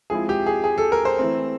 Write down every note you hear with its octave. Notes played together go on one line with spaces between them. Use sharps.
F3 G#3 C4 E4 G#4
G4
G#4
G#4
A4
A#4
C5
E3 A3 C4